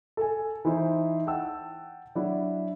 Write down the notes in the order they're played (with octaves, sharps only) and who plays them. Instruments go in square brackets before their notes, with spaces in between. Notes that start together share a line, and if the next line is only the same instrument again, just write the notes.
[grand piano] A4 G#5
E3 D#4 E4 C5
F#5 G5 A5 E6
F#3 D4 E4